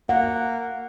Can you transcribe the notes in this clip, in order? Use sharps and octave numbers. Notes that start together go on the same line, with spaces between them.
A#3 F#5